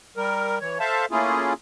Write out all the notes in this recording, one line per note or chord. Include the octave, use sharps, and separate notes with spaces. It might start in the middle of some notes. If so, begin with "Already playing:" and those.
G3 A#4
E3 C#5
A4 C5 E5 F5 A5
A3 A#3 C#4 E4 F4 G#4